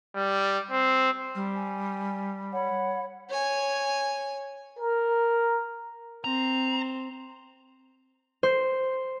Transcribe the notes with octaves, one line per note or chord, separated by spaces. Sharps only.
G3
C4
G3
G#5
C#5 F#5 B5
C#5 G#5
A#4
C4 C5 A#5
C5